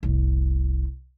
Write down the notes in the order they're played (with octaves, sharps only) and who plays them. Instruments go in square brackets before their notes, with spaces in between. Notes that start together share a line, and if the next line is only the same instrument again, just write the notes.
[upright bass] F1 C2